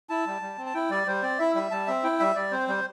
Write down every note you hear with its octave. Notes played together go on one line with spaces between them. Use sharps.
E4 A5
G3
G3
C4
A5
E4 G5
G3 D5
G3 C5
C4 D5
E4 E5
G3 E5
G3 A5
C4 E5
E4 G5
G3 E5
G3 D5
C4 C5
G3 C5